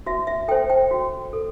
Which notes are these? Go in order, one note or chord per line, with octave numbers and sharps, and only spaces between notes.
F#4 E5
E5
A4 C5 G5
G5
F#4
A4